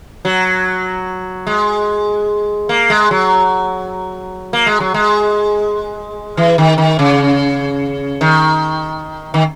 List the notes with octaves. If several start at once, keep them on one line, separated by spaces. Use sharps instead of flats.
F#3
G#3
A#3
G#3
F#3
A#3
G#3
F#3
G#3
E3
D#3
D#3
C#3
D#3
D#3